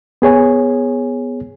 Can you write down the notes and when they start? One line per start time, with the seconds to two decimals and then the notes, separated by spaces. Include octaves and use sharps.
0.22 B3 G#4 C#5 G#5